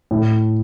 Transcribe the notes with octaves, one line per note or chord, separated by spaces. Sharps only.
A2